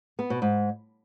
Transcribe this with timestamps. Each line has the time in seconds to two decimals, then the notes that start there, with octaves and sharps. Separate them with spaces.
0.19 B3
0.30 B2
0.42 G#2